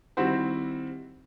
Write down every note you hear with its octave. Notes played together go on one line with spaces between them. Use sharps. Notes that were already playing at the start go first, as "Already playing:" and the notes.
D#3 G3 C4 E4 F#4 C5